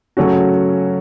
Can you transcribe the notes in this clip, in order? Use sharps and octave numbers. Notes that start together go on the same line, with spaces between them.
C#3 F#3 A3 C#4 F#4